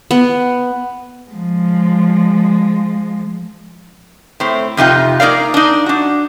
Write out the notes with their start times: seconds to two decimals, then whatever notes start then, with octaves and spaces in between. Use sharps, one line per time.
0.11 B3
1.30 F3 G#3
4.40 A2 C4
4.77 F2 C3 D#4 F4 G5
5.20 A#3 D#4 A#4 D5 F5
5.54 D4 D#4
5.86 D4 F#4